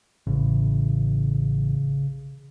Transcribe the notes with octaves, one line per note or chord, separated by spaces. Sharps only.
A1 C#3